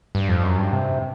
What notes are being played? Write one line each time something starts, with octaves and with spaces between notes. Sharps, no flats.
G2
F2
F#2
G2
C3